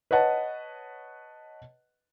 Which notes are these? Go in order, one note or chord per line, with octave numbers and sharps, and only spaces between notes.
B4 C#5 D#5 F#5 A5